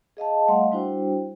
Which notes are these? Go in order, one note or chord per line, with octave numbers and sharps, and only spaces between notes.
G#4 D#5 F5 A5
G3 A3 D#5 F5 F#5 C6
G3 D4 E4 F#4 C5 G5